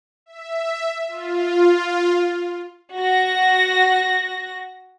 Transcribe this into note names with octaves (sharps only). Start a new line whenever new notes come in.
E5
F4
F#4 A#6